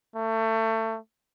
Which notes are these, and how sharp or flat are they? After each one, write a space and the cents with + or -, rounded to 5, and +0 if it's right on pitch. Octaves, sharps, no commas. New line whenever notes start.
A3 +25